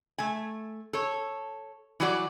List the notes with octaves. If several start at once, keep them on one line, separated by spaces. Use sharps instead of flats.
A3 G#5
A4 C#5
E3 F#3 G3 D4 F#4 D5